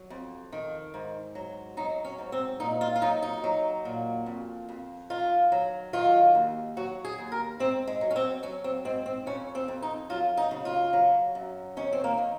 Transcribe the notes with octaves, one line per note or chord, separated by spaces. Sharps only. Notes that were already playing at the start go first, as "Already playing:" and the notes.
Already playing: F#3
F2
D#3
G#2
F#3
F#3 D#4
C#4
G#2
C4
A#2 D#4
F4
F4
F#3 D#4
D#4
F#3
A#2
F2
F2
D#3 F4
F#3
D#3 F4
D#2
F#3 F#4
G#4
D#2
A#4
G#2 C4
G#3
F#3
C#4
C4
F#3 C#4
C4
G#2 C4
C4
F2 C#4
C4
F2
D#4
F#3 F4
D#4
C#3
F4
F#3
F#2
D#3 C#4
C4
A#3
D#3